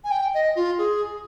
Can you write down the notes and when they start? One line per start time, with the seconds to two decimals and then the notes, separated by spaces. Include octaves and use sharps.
0.04 G#5
0.11 G5
0.34 D#5
0.56 F4
0.78 G#4